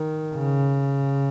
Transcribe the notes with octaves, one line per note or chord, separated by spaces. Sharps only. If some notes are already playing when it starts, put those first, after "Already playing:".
Already playing: D#3
C#3